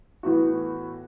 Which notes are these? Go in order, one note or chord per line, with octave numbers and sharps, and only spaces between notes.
A2 E3 B3 F#4